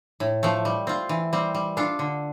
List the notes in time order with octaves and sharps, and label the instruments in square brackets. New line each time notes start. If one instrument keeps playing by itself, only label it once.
[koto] A2
F3 A3
G3
C4 F4
E3
G3 C4
G3
D4 F4 A4
D3